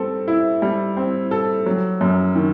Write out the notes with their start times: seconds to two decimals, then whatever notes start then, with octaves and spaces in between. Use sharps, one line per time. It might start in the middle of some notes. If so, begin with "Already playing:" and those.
Already playing: G3 C4 A4
0.28 E4
0.62 G3
0.97 C4
1.31 A4
1.66 F#3
2.01 F#2
2.35 D#3